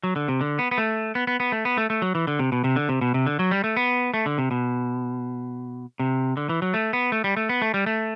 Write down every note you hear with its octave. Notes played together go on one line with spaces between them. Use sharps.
F#3
D3
C3
D3
B3
B3
A3
B3
B3
B3
A3
B3
A3
A3
F#3
E3
D3
C3
B2
C3
D3
C3
B2
C3
D3
F#3
G3
A3
B3
A3
D3
C3
B2
C3
D3
E3
F#3
A3
B3
A3
G3
A3
B3
A3
G3
A3